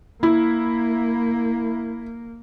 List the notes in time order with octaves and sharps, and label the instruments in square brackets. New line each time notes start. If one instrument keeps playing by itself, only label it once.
[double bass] A#3 [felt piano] E4